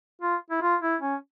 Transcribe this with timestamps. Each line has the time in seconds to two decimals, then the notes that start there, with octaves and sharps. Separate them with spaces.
0.22 F4
0.50 E4
0.62 F4
0.81 E4
1.01 C#4